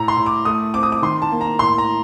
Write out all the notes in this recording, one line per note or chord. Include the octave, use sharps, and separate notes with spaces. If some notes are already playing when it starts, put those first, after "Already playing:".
Already playing: A2 A#5
C6
A2
D6
A3 D#6
C4 D6
D#6
D6
D#3 C6
A5
A#3
A#5
A2 C6
A#5